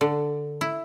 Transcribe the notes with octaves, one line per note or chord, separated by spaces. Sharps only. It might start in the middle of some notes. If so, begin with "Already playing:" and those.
D3
E4